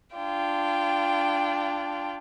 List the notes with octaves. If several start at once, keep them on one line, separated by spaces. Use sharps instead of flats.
D4 F4 G5